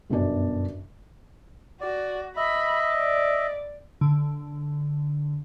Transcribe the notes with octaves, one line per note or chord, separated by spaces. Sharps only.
G1 F#2 B2 D4 D5
F#4 D5
D#5 E5 B5
D5
D3